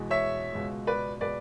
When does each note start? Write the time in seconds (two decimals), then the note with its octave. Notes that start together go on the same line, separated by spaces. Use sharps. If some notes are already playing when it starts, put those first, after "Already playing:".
Already playing: E2 B2 G#3
0.10 C#5 E5
0.53 C#2 B2 G#3
0.87 B4 D5
1.20 B2 G#3 B4 D5